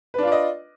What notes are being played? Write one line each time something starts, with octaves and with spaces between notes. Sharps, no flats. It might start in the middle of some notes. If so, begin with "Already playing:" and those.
D4 F4 B4 D5 D#5